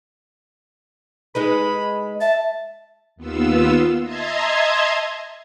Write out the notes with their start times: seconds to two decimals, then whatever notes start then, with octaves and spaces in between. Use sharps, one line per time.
1.35 G#3 D#4 B4 B5
2.21 E5 A5
3.16 D#2 B3 F4 E6
4.03 D#5 E5 A5 A#5 C6 G#6